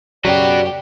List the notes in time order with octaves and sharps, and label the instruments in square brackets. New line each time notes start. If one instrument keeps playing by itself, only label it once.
[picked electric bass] F#2 C#3 F#3 [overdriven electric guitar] F#4 B4 [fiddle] G4 [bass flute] D5